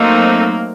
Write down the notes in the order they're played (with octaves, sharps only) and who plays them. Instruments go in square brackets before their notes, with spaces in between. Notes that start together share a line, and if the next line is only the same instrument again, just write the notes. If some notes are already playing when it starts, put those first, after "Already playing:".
Already playing: [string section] F#3 A3 C4 D#4 [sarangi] A#3